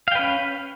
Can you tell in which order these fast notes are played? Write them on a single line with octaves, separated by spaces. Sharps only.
F5 G5 B4 C#4